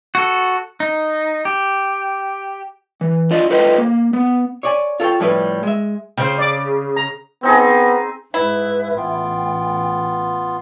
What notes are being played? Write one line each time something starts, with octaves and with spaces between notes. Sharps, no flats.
F#4 A4
D#4
G4
E3
D4 F4 D5 D#5
F4 A4 B4 C5 D#5 G5
A#3
B3
C#5 D5 G#5
F4 A4 A#4 C#5 G5
A2 F3 G3 E4 B4
G#3 E5
C#3 C5 G5
D5 D6
A#5
B3 C4 D#4 G#4
G#2 E4 B4
A1 B3 F4 G5